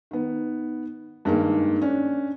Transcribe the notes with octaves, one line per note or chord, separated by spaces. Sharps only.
D#3 B3
G2 D#3 G#3 A#3
C#4 D4